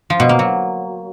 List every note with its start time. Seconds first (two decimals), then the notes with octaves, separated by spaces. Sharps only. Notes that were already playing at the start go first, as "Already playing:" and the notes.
0.10 F3
0.20 B2
0.29 A#3
0.39 F#3